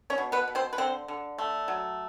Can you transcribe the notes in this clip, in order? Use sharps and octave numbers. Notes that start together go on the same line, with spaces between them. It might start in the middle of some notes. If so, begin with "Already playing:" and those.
C#4 C#5
B2
B3 B4
B2
C4 C5
B4
D3 C4 C5
D3
A3
F#3